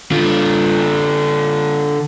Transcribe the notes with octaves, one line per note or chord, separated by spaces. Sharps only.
D3 F4